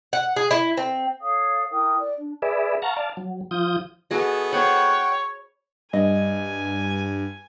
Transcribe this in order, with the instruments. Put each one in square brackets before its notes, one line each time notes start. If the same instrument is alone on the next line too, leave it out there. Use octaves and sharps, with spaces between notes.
[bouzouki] F#5
G#4
E4
C4
[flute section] A4 C#5 F5 D#6
E4 A#4 G5 D#6
D5
D4
[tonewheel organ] G#4 B4 D5 E5
F5 F#5 A5 A#5 C#6
D5 F5 A5
F#3
F3 F4 D#6 G6
[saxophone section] E3 B3 A4 [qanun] F#4 G#4 D#5
[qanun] C5 B5 [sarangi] C#5 [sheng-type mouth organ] F#5 G5
[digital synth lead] G2 [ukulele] D#5 [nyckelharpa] G#5